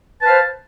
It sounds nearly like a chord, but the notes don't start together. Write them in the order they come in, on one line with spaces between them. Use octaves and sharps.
A5 B4 F5 C5